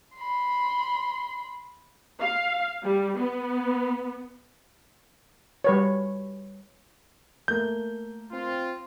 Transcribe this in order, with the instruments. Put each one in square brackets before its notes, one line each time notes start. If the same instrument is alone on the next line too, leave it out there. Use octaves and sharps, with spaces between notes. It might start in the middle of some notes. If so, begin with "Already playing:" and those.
[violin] B5 C6
[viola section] F5
G3
B3
[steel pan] G3 B4 C#5
[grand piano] A3 A#3 [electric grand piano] G6
[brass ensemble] C4 F4